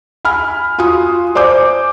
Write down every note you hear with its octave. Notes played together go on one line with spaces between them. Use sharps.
G#5 B5 F6
F4 F#4 G#5 D#6
C5 D5 G#5 D6 G6